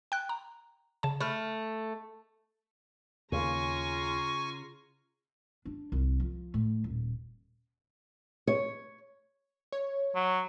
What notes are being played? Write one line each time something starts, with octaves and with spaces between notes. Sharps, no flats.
G5 F#6
A#5
C#3 A5
A3 B5 F6
D#2 C#3 A#3 F4 G#5 A#5 C#6
D4
C2
F3
A2
D#1
C#5
C#5
F#3